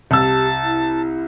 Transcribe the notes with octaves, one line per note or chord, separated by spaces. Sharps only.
C2 G4 A5 E6
E4